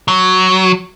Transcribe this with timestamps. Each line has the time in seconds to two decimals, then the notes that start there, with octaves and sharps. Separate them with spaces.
0.08 F#3